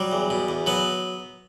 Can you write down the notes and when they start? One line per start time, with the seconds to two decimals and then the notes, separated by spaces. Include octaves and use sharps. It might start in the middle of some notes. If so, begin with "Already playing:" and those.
Already playing: F#3 G3
0.12 E2
0.30 B2
0.49 E2
0.66 F#3 B3